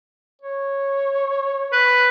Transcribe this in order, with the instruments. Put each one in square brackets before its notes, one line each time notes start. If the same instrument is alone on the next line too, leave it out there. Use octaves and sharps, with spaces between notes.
[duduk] C#5
[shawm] B4